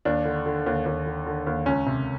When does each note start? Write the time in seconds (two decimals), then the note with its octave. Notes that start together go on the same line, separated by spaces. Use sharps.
0.05 D#2 D4
0.25 D3
0.46 D3
0.66 D#2
0.86 D#2
1.06 D3
1.26 D3
1.47 D#2
1.66 C#2 C#4
1.86 C3